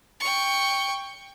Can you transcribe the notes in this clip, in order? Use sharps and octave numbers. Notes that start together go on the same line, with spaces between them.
G5 C#6